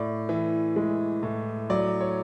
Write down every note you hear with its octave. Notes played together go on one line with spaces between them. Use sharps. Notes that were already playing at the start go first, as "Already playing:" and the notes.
Already playing: A2 D5
E3
G#3
A2
F#3 D5
C#5